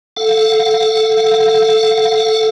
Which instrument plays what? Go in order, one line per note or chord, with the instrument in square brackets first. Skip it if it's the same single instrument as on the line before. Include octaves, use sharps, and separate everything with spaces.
[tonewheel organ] A4 F5 F#5